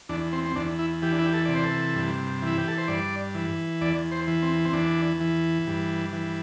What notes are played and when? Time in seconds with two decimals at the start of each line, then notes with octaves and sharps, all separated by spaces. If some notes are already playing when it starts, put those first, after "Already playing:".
0.09 E2 D4
0.33 C4
0.45 C4
0.56 E2 D4
0.79 E4
1.02 E3 G4
1.12 D4
1.19 E4
1.26 G4
1.33 A4
1.45 C3 D5
1.55 C5
1.64 A4
1.95 G2
2.42 E3 E4
2.58 G4
2.68 A4
2.78 C5
2.88 G2 D5
3.35 E3
3.81 E2 D5
4.12 C5
4.28 E3
4.42 C4
4.65 C4
4.73 E2 D4
5.21 E3
5.67 G2
6.13 E3